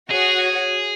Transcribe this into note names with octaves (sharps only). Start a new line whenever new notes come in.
F#4 G#4 C#5 F#5